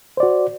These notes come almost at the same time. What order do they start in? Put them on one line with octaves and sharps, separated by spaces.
C5 D5 F#4